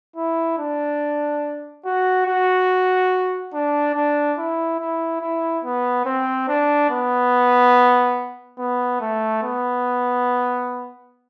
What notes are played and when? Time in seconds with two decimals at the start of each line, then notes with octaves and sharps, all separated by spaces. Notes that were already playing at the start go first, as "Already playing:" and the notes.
0.16 E4
0.59 D4
1.85 F#4
2.27 F#4
3.54 D4
3.95 D4
4.38 E4
4.79 E4
5.21 E4
5.64 B3
6.06 C4
6.48 D4
6.90 B3
8.58 B3
9.01 A3
9.43 B3